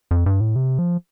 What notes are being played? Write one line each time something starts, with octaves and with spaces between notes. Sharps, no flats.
F2
G2
A2
C3
F3